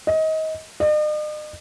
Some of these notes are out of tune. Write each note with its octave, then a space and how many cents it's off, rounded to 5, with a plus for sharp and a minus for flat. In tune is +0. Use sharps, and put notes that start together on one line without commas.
D#5 +25
D#5 -45